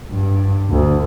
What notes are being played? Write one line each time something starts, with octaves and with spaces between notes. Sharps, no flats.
G2
D2